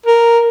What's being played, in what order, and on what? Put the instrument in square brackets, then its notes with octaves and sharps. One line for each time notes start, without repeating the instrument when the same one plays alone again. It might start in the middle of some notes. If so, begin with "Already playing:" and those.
[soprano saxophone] A#4